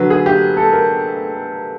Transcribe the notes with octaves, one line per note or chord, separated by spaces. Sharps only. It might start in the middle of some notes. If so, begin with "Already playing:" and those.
Already playing: D3 F#3 B4
G#4
G4
A4
A#4